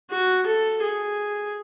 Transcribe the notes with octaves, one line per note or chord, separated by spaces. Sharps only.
F#4
A4
G#4